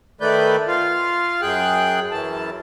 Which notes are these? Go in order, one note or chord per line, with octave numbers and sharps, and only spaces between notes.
D#3 A3 B4 D5 G6
F4 F5
F#2 G#4 G5 F#6
F#2 E3 A5